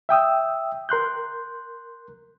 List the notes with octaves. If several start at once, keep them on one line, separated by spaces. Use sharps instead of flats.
E5 G5 D#6 E6
A#4 C6 F#6 G6